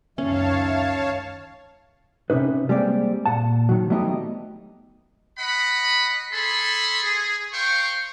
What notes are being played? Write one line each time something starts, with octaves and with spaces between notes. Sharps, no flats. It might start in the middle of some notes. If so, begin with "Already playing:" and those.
C#2 F#2 D#3 C#4 C#5 E5 F5 A5
C3 C#4 D#4 B4
G3 G#3 A#3 C4 D5
A#2 F#5 A5
D#3 F#3
F#3 G3 A3 B3 D#4 G4
D#5 F#5 B5
G#4 A4 B5 C6
G#4
C5 F5 G5 C#6